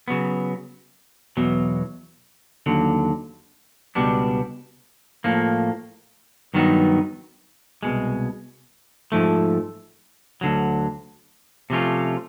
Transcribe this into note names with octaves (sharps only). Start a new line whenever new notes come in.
C#3 F#3 B3
E2 B2 F#3
D#2 D3 F#3
C#2 B2 G3 B3 D4
A2 F3 A#3
G2 D#3 F#3 B3 D#4
C2 B2 G#3
G#2 F3 A3
D2 D3 F#3
C3 F3 A3 C#4 F4